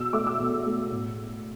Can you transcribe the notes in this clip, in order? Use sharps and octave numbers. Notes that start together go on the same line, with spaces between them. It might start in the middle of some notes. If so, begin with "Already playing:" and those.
Already playing: B2 E6
A3 D6
E6
B2
A3
A2